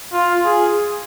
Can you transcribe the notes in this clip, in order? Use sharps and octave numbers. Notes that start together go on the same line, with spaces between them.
F4
G#4